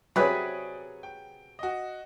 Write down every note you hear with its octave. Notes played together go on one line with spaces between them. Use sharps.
C3 F#3 G#4 B4 C#5 D5 G5 D#6
G5
F#4 D#5